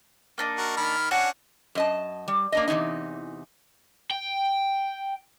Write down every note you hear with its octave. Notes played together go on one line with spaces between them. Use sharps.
A#3 D4 D#4
F#4 A#4
D#3 B5 F6
C#4 D4 F#4 F#5
F#2 D#5 A5
G3
A#3 D4 D#5
E2 C3 D#3 E3 D#4
G5